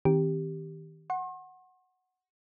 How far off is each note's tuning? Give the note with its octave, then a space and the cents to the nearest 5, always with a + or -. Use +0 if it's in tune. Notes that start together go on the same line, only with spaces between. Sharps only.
D#3 +25 C4 +0 G4 +0
F#5 +0 C6 +45